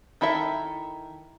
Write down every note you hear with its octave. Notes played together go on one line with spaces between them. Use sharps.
D#3 E4 A4 E5